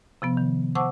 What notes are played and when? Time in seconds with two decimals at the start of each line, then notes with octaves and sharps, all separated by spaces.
0.22 C3 F3 B3
0.37 D#3
0.75 C5 F#5 A5 C#6 D6 E6